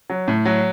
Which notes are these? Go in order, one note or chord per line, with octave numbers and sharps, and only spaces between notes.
F#3
A2
F#3